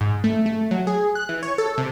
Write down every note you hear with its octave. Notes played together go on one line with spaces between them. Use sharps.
G#2
A3
A3
F#3
G#4
F#6
E3
C#5
A4
C3